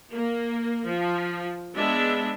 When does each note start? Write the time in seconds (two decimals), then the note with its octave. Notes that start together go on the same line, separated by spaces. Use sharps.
0.11 A#3
0.85 F3
1.76 G#3 B3 D4 E5